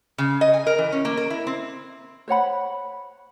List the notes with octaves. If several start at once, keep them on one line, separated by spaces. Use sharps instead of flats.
C#3
D#5
G#5
A#4
E3
C#4
A#3
A#4
E4
C4
C5 C#5 F#5 B5